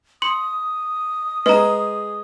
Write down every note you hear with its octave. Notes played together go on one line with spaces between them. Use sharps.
C6 D#6 C#7
G#3 G#4 B4 A#5